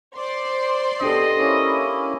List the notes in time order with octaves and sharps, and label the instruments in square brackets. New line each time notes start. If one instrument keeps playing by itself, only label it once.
[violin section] C5 D5 C6 [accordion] D6
[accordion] B2 [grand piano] D4 G4 A4 [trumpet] D#5
[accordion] A#3 C#4 E4